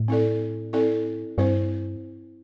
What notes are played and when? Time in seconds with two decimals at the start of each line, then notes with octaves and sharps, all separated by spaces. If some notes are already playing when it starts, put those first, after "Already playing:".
Already playing: A2
0.08 C4 E4 A4 D5
0.73 C4 E4 A4 D5
1.38 G2 C4 E4 C5